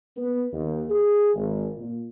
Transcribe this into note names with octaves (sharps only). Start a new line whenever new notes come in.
B3
D#2
G#4
G#1
A#2